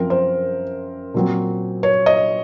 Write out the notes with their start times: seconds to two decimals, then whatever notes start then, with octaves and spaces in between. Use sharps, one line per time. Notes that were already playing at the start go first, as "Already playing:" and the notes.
Already playing: F#2 F3 C4 A#4
0.10 C5
1.14 A#2 F#3 C4
1.83 C#5
2.06 D#5